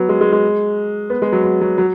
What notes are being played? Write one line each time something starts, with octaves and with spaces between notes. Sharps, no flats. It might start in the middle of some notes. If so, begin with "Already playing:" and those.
Already playing: F#3 B3
G#3
G#3
G#3
B3
G#3
F#3
F#3
F#3
F#3